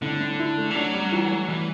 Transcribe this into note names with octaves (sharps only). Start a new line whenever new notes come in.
A2 D3
A2
E4
A3
E3
F#3 D4
G3
E3
A3
E3 G3